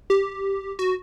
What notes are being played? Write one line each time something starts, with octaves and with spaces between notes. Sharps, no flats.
G4
F#4